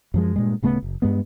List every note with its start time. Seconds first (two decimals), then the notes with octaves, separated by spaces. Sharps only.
0.14 F#2 F3 G#3
0.36 G2 A#2 G#3
0.62 D1 C#3 A3 B3
0.82 F#1
1.02 G2 G#3 B3